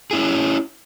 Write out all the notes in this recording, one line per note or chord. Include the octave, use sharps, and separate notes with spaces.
C#4 E4 G#4